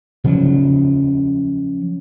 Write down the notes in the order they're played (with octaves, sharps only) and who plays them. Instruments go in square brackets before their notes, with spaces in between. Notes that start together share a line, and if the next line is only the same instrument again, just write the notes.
[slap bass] C#3 F3 F#3